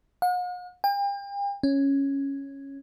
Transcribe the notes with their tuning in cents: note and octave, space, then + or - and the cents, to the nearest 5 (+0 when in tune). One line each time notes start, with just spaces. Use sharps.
F#5 -45
G5 +40
C#4 -5